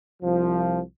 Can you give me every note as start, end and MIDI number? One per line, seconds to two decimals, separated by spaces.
0.22 0.80 36
0.22 0.80 53